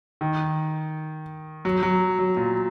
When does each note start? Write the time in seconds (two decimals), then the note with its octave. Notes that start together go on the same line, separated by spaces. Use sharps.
0.21 D#3
1.65 F#3
1.83 F#3
2.19 F#3
2.37 A#2